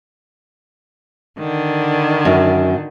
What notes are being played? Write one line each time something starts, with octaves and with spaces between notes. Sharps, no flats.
D3 D#3
F#2